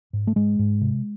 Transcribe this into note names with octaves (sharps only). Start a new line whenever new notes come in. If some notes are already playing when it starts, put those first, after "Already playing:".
G#2
A3
G#2 G#3
G#2
C3